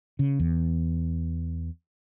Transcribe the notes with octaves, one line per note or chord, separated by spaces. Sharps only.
C#3
E2